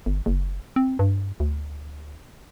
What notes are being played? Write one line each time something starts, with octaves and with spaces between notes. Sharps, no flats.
G1
F#1
C4
G2
D2